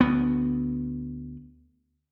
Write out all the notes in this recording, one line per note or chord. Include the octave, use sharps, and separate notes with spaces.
D2 B3